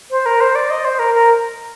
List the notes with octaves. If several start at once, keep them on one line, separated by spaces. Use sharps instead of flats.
C5
A#4
C5
D5
D#5
C5
A#4
A#4